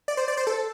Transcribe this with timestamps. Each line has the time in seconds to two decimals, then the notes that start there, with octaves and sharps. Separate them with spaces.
0.08 D5
0.17 C5
0.28 D5
0.37 C5
0.47 A4